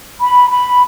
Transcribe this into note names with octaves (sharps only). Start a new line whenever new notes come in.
B5
B5